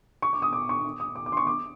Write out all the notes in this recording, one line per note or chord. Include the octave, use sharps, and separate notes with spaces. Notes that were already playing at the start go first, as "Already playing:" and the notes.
C#6
D6
D#6
D6
C#6
D#6
D6
D6
C6
C#6
D6